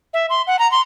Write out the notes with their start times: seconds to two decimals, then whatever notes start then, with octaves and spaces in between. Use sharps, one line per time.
0.14 E5
0.30 C6
0.47 F#5
0.59 A#5
0.72 C6